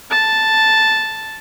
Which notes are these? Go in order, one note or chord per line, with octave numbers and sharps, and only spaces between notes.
A5